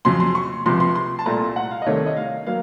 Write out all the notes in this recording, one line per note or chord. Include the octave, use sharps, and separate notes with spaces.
F2 C#3 F#3 C6
C6
C#6
C#2 C3 F3 C6
C6
C6
A5
C2 A#2 A3 A#5
F#5
F5
D#5
C2 C3 D#3 A3 C#5
D#5
F5
F#3 A#3 F5